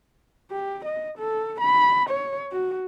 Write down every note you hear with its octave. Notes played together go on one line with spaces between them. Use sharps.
G4
D#5
A4
B5
C#5
F#4